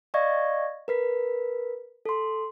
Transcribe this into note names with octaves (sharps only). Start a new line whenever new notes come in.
D5 D#5 F5 C#6 G#6 A#6
A#4 B4 B6
A4 C6